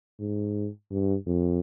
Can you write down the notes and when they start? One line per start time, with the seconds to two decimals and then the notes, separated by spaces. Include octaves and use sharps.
0.19 G#2
0.91 G2
1.27 F2